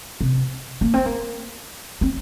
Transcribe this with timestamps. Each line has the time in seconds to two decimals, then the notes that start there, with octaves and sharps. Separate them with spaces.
0.21 C3
0.81 A#3
0.94 C4
1.06 A#3
2.01 C4